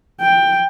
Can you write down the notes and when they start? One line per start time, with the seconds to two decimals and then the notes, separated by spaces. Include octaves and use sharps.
0.21 G5